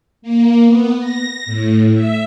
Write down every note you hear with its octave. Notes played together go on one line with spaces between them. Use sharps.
A#3
B3
A#6
A2
E5